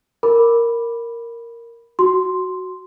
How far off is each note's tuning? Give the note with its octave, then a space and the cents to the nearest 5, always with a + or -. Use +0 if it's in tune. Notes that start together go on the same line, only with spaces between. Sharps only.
A#4 -5 B5 -5 D6 +0
F#4 +0 C6 +0